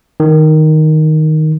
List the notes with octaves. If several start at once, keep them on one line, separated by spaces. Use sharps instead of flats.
D#3